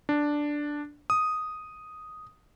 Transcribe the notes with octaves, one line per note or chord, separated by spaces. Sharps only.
D4
D#6